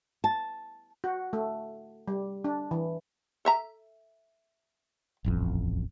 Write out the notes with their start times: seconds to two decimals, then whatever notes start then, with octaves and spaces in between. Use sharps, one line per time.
0.24 A5
1.04 F#4
1.33 A3
2.08 G3
2.44 D4
2.71 E3
3.45 A4 E5 A#5
5.24 D#1 A1 F2